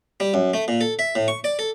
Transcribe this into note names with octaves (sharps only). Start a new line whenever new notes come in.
G3
F#2
A3
A#2
A4
E5
A2
C#6
D5
A4